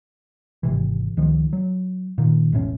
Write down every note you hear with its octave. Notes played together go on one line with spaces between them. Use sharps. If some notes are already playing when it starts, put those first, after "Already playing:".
G#1 C3 E3
C#2 D#3 F3
F#3
A#2 D#3
E1 A1 A2 C#4